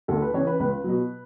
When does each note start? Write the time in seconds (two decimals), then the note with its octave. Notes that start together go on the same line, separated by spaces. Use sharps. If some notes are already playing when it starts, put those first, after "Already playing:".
0.08 D2 A4
0.22 B4
0.34 C#3 E3 C#5
0.47 B4
0.60 C#2 B4
0.84 B2 F#3